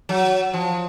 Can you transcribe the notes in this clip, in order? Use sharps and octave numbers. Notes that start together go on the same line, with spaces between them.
F#3
F3